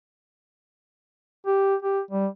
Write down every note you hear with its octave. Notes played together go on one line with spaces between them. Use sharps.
G4
G4
G3